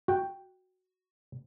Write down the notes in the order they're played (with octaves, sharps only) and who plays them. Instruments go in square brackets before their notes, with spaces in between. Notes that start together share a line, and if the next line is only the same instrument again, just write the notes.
[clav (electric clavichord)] F#4 G5